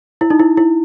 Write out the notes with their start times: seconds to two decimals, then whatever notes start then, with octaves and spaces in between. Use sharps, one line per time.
0.21 E4
0.30 D#4
0.40 E4
0.57 E4